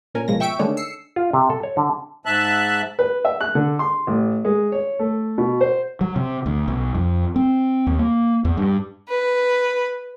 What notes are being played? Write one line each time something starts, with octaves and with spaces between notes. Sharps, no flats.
A#2 C#4 A#4 G#5
G#1 B2 F3 G#3 A#6
E5 G5 C#6 E6 B6 D7
D3 D#3 G#3 A3 C#4 D4
E6 C7 C#7
F4
C3
A4
C#5
D3
G#2 E5 A5 F#6
B4
E5
F#6
D3
C6
A1
G#3
C#5
A3
B2
C5
F#3
C3
D2
B1
F2
C4
D#2
A#3
E2
G2
B4